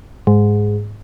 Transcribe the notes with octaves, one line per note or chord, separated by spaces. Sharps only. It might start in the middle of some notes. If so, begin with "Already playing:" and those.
G#2